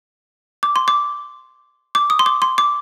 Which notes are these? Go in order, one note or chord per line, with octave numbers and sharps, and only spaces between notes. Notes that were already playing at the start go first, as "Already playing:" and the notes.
D6
C6
D6
D6
D#6
C6
D6
C6
D6